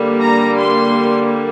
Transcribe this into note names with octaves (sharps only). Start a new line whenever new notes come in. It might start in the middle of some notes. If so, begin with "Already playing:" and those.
Already playing: D3 G3 A#3
A#5
C6